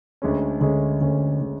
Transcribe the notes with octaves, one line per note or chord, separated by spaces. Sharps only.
D2 D3 G#3 C#4
D2 D3 G#3 C#4
D2 D3 G#3 C#4
D3 G#3 C#4